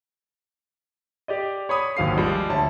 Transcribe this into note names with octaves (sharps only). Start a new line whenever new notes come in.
G4 D5 D#5
C#5 B5 D#6
G#1 D#2 F#3 F5 D#6 C7
F3 G3 G#3
D2 C#5 A5